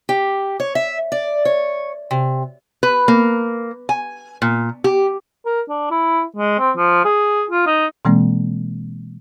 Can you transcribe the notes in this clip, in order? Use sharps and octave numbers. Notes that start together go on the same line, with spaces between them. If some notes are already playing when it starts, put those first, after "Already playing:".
G4
C#5
E5
D5
C#5
C3
B4
A#3
G#5
A#2
G4
A#4
D4
E4
G#3
C4
F3
G#4
F4
D#4
B2 E3 G#3 A#3 C4